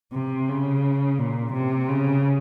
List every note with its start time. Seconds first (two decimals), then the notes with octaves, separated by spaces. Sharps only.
0.12 C3
0.48 C#3
1.18 A#2
1.53 C3
1.88 C#3